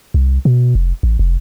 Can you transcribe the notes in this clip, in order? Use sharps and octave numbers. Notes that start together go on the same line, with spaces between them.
C2
B2
F1
A1
F1